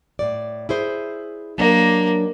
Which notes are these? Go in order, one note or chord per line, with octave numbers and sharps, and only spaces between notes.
A2 D5
E4 G#4 C5
F#3 A#3 D4 D#5